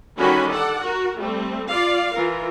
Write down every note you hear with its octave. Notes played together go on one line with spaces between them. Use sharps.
D3 D#3 G3 C#4 F#4 B5
A4 D5 F#5
F#4 A#4
G3 A3 C4
F4 D5 F5
E3 F4 A#4